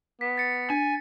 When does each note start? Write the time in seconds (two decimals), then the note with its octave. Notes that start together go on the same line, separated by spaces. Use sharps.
0.21 B3 B6
0.38 A6 C#7
0.70 D4 G#5